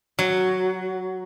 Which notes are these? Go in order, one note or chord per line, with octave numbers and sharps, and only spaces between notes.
F#3